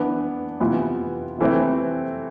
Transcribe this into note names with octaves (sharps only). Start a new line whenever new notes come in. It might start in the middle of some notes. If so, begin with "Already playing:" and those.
Already playing: E3 B3 D4
C3 E3 B3 F4
C3 E3 A3 C4 E4